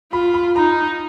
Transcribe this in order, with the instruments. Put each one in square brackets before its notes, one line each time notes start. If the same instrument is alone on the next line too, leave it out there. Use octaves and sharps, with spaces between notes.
[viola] F4 [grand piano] B5
[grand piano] B5
[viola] D#4 [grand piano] A#5